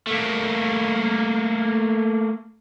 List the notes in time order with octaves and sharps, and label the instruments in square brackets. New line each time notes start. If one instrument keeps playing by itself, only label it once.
[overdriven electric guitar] A3 A#3